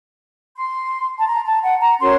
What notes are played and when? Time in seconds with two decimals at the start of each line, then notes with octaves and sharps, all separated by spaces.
0.56 C6
1.18 A5
1.27 A#5
1.45 A5
1.63 F#5
1.81 A#5
1.99 C#4 F#4 A#4 C#5 C6